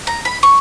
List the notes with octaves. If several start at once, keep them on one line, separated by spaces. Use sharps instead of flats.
A#5
B5
C#6